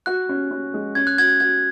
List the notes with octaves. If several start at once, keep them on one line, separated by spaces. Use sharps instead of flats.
F#4 F#6
C#4
C#4
G#3
C#4 G#6
F#6
F#4 G#6
F#4 G#6